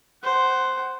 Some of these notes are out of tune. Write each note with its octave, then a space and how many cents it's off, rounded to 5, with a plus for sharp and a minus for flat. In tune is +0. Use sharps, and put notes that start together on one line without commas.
C5 +0 F#5 +15